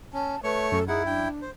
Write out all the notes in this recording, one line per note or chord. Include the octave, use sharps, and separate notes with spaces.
C#4 A5
A3 B4 C#5 C#6
F#2 A4
D#4 E4 G#4 F#5
D4 G5
C5